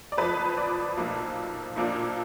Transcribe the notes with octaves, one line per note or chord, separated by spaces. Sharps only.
D5
F#1 F2 F3 B4
D5
B1 A#2 F3 A#3
B1 A#2 F3 A#3 D4